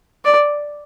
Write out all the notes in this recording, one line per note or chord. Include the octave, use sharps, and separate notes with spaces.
D5